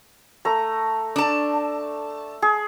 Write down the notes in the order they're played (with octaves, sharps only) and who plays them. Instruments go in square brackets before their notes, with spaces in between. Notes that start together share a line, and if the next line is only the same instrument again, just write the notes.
[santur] A3 A#5
[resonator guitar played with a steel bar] D4 A5
[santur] G#4